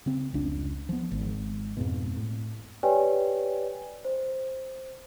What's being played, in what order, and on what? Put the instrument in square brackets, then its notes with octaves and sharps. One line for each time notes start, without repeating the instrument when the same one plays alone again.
[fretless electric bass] C#3 C4
F1 C#2 D4
F3 B3
G#1
F2 G#2 B2
A2
[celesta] G4 B4 C#5 D5 G5 G#5
C5